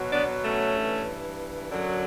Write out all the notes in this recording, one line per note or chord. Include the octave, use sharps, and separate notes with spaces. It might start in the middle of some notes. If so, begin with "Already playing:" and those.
Already playing: B2 F#3
B3 D4
A3 C#4
G2 E3
F#2 D3 F#3